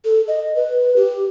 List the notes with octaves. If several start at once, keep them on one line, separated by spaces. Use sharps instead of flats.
A4
D#5
B4
G4